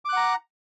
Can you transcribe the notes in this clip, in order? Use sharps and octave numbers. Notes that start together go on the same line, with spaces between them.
F#5 A#5 D6 F#6